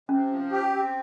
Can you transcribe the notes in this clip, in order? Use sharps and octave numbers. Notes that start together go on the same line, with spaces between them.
C3 C#4
F3
G4
C4